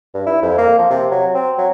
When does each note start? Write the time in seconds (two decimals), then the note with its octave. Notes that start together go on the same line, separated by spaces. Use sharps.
0.14 G2
0.26 E4
0.42 F2
0.58 A#3
0.78 F3
0.90 C3
1.11 F#3
1.34 C4
1.58 F#3